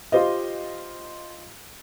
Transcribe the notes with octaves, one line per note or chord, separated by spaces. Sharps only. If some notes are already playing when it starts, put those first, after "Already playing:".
F4 G4 C5 D#5